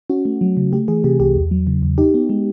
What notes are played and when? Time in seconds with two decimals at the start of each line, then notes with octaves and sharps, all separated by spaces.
0.10 C#4 F#4
0.25 A3
0.41 F#3
0.57 C#3
0.73 A3 G4
0.88 E3 G#4
1.04 C3 G4
1.20 C2 G4
1.36 E2
1.51 F#3
1.67 C#3
1.82 E2
1.98 D#4 G4
2.14 B3
2.29 G#3